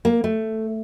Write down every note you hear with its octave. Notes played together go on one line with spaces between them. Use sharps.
A#3
A3